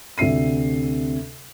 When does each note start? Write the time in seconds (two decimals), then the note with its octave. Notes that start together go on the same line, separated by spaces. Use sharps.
0.18 D2 C3 E5 C7 D#7